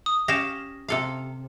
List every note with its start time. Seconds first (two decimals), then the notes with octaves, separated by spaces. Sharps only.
0.06 D#6
0.28 C#4 G4 F5 A#6 E7
0.88 C3 A4 F5